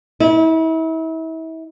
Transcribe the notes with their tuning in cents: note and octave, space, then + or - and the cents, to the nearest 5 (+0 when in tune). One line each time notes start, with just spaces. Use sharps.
E4 -35